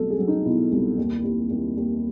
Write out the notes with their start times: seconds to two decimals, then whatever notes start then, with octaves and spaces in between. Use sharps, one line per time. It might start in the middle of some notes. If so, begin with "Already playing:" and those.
Already playing: C2 B2 F#3 A3 A4
0.10 G#4
0.19 F#3
0.28 D#4
0.46 B2 E4
0.72 C2
0.98 D#2
1.24 D#2
1.50 D#2
1.77 D#2